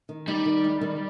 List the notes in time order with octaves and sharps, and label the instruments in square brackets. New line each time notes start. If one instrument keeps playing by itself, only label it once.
[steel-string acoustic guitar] D#3
[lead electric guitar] G3 [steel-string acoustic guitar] D#4
[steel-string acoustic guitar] D#3
G#3
D#3